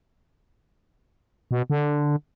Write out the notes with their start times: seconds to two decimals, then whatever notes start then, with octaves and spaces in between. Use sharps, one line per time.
1.51 B2
1.70 D3